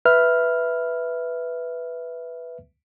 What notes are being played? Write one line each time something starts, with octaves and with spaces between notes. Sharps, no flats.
B4 E5 F6